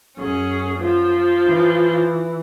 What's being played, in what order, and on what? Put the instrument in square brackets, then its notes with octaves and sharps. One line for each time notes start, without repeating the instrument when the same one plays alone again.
[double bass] F#2 [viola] C#4 G#4
[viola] F3
[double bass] E3